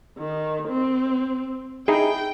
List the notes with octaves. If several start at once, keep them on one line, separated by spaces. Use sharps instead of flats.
D#3
C4
D#4 E4 G#4 G5